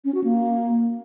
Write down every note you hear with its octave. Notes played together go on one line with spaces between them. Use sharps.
C#4
F#4
A#3